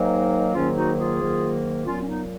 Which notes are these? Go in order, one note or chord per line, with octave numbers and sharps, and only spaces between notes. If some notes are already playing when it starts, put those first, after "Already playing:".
Already playing: G#2 D#3 F#3 A#3
G#2 D#3 F#3 A#3 C#4 F4
D#4 F#4
F4 G#4
G#2 D#3 F#3 A#3
A#2 F#3 B3 C#4 F4
C#4
B3 D#4